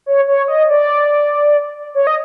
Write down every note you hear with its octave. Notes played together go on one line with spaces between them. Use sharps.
C#5
C#5
D#5
D5
C#5
D#5